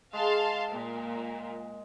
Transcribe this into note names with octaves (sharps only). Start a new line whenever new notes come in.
G#3 F5 A5 C6
A#2